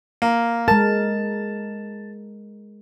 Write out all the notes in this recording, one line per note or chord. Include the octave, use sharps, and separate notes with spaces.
A#3
G#3 A#4 A5